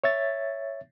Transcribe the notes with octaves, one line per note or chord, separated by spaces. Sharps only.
C#5 E5 A6